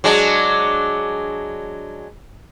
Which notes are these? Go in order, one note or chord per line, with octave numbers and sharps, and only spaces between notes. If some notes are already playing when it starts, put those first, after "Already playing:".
F#3 G#3 D4